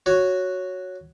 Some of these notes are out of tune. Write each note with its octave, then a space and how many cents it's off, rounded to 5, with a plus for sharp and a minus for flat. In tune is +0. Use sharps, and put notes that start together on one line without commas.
F#4 +0 C#5 +0